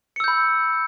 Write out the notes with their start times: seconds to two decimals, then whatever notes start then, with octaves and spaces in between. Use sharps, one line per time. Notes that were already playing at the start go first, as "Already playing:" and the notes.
0.16 C#7
0.20 E6
0.24 G6
0.28 B5